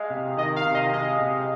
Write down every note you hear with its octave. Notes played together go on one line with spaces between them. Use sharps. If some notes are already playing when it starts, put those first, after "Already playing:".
Already playing: G#3 F5
C3
D#3 D#5
F5
C3
D#5
G#3 D#5
C3